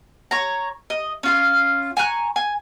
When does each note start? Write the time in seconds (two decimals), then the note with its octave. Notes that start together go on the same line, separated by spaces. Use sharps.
0.31 C#5 A#5
0.90 D#5
1.23 C#4 F4 F5
1.97 G#5 A#5 C#6 F#6
2.36 G#5